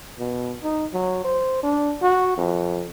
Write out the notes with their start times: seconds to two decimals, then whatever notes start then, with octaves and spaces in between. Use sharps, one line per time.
0.19 B2
0.64 D#4
0.93 F#3
1.24 C5
1.63 D4
2.02 F#4
2.37 F2